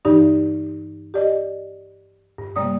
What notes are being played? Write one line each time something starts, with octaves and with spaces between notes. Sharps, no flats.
G2 E3 D#4 G4 D5
G4 D5 D#5
G2
C3 G3 A#3 D5 D#6